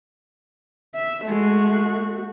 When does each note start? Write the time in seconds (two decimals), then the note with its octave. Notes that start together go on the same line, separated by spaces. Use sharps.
0.95 E5
1.27 G#3 A3 F#4